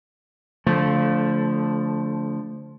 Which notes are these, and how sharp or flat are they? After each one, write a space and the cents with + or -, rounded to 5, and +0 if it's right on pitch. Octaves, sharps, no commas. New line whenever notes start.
D3 -25 F3 +5 A3 +0